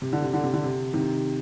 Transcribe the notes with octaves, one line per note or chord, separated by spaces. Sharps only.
C3
D3
C3
D3
C3
D3
C3
C3 D#3